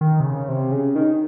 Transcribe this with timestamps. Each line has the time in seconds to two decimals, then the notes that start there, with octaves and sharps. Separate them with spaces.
0.01 D#3
0.20 C3
0.25 C#3
0.48 C3
0.71 C#3
0.96 D#3